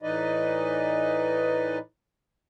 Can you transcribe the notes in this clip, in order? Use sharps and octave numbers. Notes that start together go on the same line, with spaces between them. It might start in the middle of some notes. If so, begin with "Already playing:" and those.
A2 E3 D#4 B4 D5 D#5